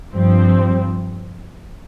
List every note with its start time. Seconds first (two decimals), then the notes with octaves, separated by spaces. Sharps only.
0.13 G2 F3 C4